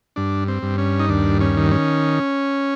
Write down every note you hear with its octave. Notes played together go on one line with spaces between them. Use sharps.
G2 D4
C4
G2
C#4
D#4
D#2 D4
C#4
D#3
C#4